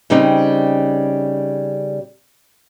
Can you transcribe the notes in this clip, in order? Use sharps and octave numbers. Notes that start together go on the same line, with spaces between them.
C#3 G3 C4 D#4